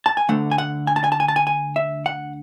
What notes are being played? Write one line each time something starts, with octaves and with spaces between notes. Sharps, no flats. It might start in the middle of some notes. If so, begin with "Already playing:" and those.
A5
G#5
D2 D3 A3 F#5
G#5
F#5
G#5
A5
G#5
A5
G#5
A5
G#5
G#5
E5
F#5